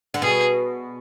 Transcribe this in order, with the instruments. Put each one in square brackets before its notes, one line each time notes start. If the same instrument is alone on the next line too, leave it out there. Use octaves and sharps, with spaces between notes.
[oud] D3
[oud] B2 [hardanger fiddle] G#4